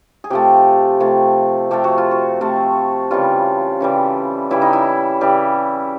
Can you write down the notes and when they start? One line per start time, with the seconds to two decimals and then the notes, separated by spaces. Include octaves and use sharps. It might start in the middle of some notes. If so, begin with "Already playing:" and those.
0.24 G#4
0.30 C3 F3 A3 G4
1.00 C3 F3 A3
1.71 C3 F3 A3 G4
1.84 F#4
1.98 F4
2.11 F#4
2.41 C3 F3 A3
3.11 C#3 E3 G3 F4
3.80 C#3 E3 G3
4.50 C#3 E3 G3 E4
4.62 D#4
4.73 E4
5.21 C#3 E3 G3